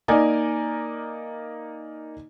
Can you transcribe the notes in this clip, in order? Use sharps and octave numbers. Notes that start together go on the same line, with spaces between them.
A#3 D#4 A#4 D5 D#5 G#5